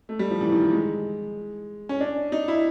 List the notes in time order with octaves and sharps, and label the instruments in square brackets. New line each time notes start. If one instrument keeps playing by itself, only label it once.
[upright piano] A3
G3
F3
E3
D#3
E3
G#3
C#4
D4
D#4
E4